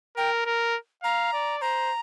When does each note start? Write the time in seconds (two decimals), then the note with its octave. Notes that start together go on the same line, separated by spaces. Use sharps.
0.17 A#4 G5
0.46 A#4
1.03 F5 A#5
1.33 D5
1.61 C5 A#5